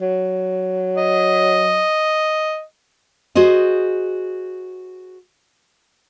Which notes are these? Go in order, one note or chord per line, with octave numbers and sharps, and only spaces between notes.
F#3
D#5
F#4 G#4 C5 D#5